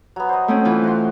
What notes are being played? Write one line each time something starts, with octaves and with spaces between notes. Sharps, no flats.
F#3 B3
C5 D#5
A3 C4 C#4
E3 F4
F#4 C6